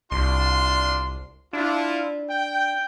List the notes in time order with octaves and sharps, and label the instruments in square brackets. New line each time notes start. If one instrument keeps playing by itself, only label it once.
[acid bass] C2 [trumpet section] D4 F4 C6
[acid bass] D4 [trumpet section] E4 F4
[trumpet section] G5